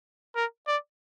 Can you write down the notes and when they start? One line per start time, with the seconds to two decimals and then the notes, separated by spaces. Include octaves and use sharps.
0.35 A#4
0.67 D5